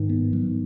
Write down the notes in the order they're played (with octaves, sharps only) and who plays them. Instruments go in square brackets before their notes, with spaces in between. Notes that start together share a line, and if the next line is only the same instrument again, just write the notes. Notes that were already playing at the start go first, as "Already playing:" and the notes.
Already playing: [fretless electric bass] G#2 [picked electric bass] D#3
[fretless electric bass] B3
F#3